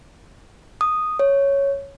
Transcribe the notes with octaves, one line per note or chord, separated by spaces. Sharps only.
D#6
C#5